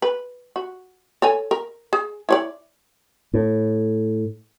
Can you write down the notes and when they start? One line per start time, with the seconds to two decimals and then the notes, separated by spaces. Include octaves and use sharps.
0.02 B4
0.56 F#4
1.22 A4 C#5 G#5
1.51 A#4
1.93 G#4
2.29 E4 C#5 D5
3.34 A2